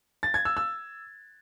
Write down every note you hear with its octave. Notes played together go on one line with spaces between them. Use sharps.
A6
G#6
E6
E6